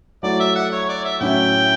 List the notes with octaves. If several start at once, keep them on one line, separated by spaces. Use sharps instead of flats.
F#3 A3 E4 D5
E5
F#5
C#5
D5
E5
A2 F#3 C#4 E4 G5